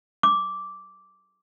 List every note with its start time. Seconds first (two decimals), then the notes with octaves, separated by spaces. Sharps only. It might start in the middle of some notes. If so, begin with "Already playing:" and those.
0.23 D6